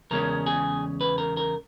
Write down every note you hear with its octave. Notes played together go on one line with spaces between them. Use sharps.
E2 C#3 G#3 C#4 A#4
G#4
B4
A#4
A#4